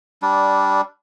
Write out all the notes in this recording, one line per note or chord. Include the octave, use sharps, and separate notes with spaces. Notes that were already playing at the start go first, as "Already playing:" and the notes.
G3 D4